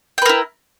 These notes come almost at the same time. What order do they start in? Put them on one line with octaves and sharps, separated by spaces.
G5 B4 A#4 E4